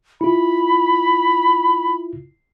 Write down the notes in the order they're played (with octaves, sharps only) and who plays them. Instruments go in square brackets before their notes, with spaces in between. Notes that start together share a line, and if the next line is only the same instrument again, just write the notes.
[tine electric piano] E4 F4 [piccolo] B5